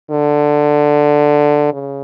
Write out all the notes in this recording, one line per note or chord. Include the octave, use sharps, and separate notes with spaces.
D3
C#3